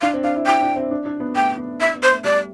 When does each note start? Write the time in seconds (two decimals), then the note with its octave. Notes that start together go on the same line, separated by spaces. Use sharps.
0.01 D4 F5
0.14 C4
0.24 D4 F5
0.36 E4
0.46 E4 G5
0.61 D4
0.76 C4
0.91 D4
1.06 D4
1.20 B3
1.36 A3 G5
1.57 B3
1.80 D4 E5
1.95 B3
2.03 C5
2.10 A3
2.24 G3 D5